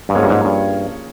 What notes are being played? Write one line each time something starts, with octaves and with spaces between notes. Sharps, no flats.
G2
G#2 F3 A#3 C#4 G#4 C#5
G2
G#2
G2